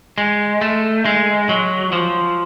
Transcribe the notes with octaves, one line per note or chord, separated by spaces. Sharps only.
G#3
A3
G#3
F#3
F3